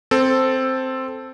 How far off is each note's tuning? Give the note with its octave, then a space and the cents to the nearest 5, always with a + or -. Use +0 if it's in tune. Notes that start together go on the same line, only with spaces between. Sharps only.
C4 +0 A4 +0